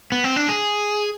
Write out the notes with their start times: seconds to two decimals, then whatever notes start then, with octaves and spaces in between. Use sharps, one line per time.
0.12 B3
0.24 C4
0.36 D4
0.49 G#4